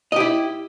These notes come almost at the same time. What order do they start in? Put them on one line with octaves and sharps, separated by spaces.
D#5 G4 E4